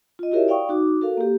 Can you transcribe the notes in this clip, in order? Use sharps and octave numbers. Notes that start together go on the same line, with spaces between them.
F4 D#5
E4 F#4 G4 A#4 C#5 E5
D5 F5 G5 C#6 D#6
D#4 F#4 D6
F#4 A4 A#4 F5
A#3 G4